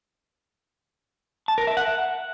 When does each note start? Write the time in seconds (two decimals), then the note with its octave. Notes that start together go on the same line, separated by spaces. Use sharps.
1.48 A5
1.58 A#4
1.67 E5
1.77 F#5